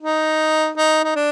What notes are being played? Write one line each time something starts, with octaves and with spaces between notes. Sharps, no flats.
D#4
D#4
D#4
D4